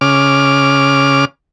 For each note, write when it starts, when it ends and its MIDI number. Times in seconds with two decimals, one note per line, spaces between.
0.01 1.25 49
0.01 1.25 86
0.01 1.25 89